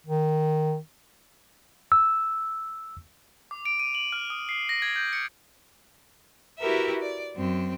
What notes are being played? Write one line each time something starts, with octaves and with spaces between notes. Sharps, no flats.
D#3
E6
D6
D7
D#7
F#7
F6
D#6
C7
A#6
G#6
G6
C#7
E4 F#4 G4 A#4 B4 E5
D5
F#2 C4